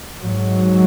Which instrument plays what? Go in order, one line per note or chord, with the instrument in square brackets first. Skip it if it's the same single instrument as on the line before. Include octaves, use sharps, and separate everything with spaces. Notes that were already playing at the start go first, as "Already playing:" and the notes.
[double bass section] G#2 F#3